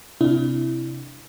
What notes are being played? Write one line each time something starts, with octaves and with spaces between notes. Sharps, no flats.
C3 D4 E4